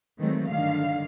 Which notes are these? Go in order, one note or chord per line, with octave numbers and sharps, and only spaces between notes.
D#3 E3 F#3 G#3 A3 C4
G2 D3 D#3 F5